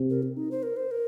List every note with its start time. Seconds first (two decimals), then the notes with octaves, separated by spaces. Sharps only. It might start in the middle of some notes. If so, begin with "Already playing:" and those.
Already playing: C3
0.10 A#4
0.23 C4
0.37 D#4
0.51 C5
0.63 A#4
0.77 C5
0.91 A#4